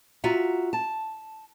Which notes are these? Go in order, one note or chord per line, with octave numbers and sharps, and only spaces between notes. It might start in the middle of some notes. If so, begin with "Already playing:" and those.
F4 F#4 E5 A#5
A5